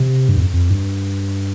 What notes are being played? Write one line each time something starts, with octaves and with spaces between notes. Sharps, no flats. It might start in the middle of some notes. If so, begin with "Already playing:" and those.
Already playing: C3
G2
F2
F2
G2